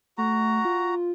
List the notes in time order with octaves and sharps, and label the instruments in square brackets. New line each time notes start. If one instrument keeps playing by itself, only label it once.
[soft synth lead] A3 [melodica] F#4 A#5
[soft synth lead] F4